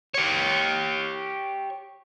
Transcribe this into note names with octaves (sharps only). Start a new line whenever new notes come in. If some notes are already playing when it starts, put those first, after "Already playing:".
G4 C#5